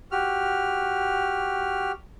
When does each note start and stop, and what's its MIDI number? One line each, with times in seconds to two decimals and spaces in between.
0.11 1.92 66
0.11 1.92 67
0.11 1.92 89